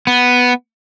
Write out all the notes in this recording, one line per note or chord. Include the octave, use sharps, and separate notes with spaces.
B3